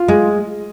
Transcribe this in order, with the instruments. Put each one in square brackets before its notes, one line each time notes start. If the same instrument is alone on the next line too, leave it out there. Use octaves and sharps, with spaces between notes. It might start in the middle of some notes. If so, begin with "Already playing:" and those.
Already playing: [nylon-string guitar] F4
G#3